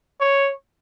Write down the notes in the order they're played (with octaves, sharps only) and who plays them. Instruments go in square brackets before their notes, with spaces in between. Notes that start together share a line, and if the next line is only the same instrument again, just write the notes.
[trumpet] C#5